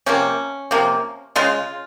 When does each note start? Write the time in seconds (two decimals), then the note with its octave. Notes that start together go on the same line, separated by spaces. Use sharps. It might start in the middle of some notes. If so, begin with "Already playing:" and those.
0.06 C3 F3 A#3 C#4
0.71 C3 F3 A#3
1.36 C#3 G#3 F4